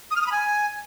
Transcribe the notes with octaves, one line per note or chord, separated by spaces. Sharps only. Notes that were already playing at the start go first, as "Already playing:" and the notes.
D#6
F6
D#6
B5
G#5